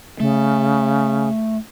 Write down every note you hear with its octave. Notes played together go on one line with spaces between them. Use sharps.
C#3 A3